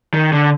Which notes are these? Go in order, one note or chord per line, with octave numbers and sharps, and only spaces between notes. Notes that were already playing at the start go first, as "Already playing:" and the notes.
D#3
D3